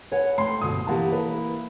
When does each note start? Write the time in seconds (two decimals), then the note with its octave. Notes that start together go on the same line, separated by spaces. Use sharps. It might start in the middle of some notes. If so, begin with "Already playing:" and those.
0.12 B4 C#5 F#5 G#5
0.38 A3 G5 C6
0.61 D2 G2 B2 D#6
0.87 E3 A#3 E4 G4 F#5 A5
1.12 B4